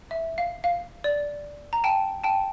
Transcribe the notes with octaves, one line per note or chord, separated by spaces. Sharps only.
E5
F5
F5
D5
A#5
G5 A5
G5 A5